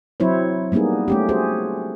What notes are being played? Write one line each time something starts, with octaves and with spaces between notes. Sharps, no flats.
F#3 C4 E4 C5 C#5
G3 A#3 B3 D#4 G#4
A3 C#4 G4
F#4 G#4 C5